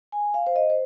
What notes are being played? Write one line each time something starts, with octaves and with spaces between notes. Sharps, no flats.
G#5
F5
C5
D#5
C5